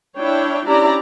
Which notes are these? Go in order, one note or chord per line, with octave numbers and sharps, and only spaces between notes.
D4 E4 C#5 G5
C#4 D4 E4 G4 D5 A#5